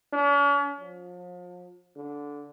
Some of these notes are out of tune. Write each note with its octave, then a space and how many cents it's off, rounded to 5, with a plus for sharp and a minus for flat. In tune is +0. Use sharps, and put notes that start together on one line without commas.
C#4 +45
F3 +35
D3 -15